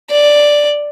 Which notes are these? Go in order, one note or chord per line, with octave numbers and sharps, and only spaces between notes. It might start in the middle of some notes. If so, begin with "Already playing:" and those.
D5